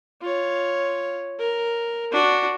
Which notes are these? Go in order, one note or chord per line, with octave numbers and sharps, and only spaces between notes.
F4 C#5
A#4
D4 F#4